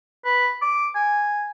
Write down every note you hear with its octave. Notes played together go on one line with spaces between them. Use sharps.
B4
D6
G#5